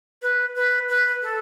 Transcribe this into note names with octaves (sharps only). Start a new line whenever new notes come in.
B4
B4
B4
A4